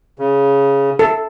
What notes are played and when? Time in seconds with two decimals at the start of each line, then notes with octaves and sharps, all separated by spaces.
0.19 C#3
0.99 A4